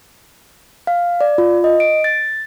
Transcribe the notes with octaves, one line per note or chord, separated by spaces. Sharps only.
F5
D5
F4
D#5
D7
A6